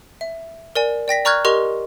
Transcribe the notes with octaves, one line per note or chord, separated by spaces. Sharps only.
E5
A#4 D5 G#5
D5 G5 A#6 B6
D5 A#5 C#6 F6 F#6 G#6
G4 A#4 D#5 C6 C#6 F7